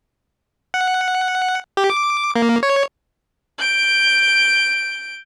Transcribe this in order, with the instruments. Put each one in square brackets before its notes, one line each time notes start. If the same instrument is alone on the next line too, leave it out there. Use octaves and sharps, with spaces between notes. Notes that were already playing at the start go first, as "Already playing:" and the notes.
[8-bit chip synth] F#5
G4
D6
A#3
C#5
[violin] G6 D7